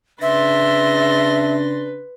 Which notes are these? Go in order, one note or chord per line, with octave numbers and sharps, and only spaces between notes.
C#3 D4 B4 E5 C6 A6 A#6